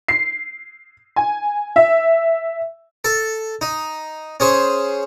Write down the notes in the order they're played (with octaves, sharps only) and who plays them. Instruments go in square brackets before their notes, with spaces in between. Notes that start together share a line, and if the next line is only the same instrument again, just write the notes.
[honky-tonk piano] C7
G#5
E5
[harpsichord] A4
D#4
C#4 G#4 C5